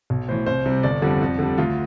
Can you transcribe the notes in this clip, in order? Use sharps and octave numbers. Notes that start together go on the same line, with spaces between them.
B1
A2 E3 C5
C2 C5
C3 G3
G1 D5
F2 D3 G3
F2
D3 G3
D2 F4